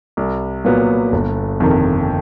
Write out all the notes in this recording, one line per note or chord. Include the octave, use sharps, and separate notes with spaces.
C2
A#2 F#3 B3
G1
F2 C3 D#3